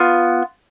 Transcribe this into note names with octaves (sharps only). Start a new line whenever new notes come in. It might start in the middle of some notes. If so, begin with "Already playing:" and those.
Already playing: B3 F4